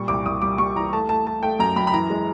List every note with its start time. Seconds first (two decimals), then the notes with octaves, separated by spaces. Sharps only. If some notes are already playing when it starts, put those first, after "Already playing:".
Already playing: A#2 G3 C#6
0.08 C2 D6
0.26 C2 D#6
0.42 G3 D6
0.58 G3 C#6
0.76 E3 A#5
0.93 A3 A5
1.09 A3 A5
1.26 A3 A5
1.43 A3 G5
1.59 F#2 A#5
1.76 F#2 B5
1.87 B5
1.93 E3 A#5
2.10 G#3